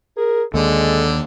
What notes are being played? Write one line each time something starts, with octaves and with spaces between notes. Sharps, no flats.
G#4 A#4
D#2 D3 G#3 A4